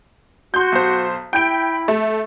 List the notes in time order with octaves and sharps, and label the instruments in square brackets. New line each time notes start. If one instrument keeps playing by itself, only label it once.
[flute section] F#4 [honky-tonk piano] C6 G6
[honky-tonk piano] B1 C5
[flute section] E4 B5 [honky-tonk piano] G5 G6 D7
[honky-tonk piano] A3